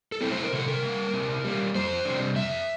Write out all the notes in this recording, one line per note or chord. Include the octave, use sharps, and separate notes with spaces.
A4
A3 C4 E4
C5
A#4
C3 A4
A#4
G3 A#3
C3
G3 A#3
F2 C5
C3 G3 D4
F2 E5